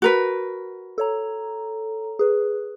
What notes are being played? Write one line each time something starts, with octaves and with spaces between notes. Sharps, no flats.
F#4 A#4 B4
A4 C#5 A#5
G#4 B4